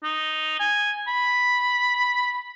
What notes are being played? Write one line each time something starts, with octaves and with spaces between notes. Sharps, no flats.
D#4
G#5
B5